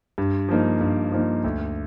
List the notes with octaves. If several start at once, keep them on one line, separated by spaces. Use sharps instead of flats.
G2
F3 A#3 D#4
G2
F3 A#3 D#4
D2